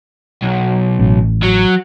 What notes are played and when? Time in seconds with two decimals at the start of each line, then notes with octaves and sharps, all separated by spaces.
0.42 B1
0.99 A1
1.43 F#3